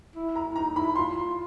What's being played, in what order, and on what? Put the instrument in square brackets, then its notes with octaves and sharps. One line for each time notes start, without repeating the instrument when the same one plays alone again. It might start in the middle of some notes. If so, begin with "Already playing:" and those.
[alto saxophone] E4
[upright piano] A#5
[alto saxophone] D#4 [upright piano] A#5
[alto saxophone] E4 [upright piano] B5
[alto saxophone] F4 [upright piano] C6